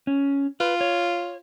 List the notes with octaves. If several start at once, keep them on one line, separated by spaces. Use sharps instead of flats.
C#4
F4 B4
C#5